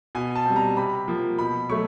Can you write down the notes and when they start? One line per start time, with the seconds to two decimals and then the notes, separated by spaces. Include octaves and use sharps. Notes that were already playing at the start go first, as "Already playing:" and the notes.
0.15 B2 G#5
0.36 A5
0.46 G3 C4
0.56 A#5
0.77 C3 B5
1.08 F3 A#3
1.38 B2 B5
1.70 F#3 A3 C#6